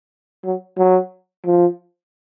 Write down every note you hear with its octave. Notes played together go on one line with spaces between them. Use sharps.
F#3
F#3
F3